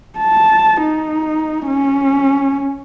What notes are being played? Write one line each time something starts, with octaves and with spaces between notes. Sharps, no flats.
A5
D#4
C#4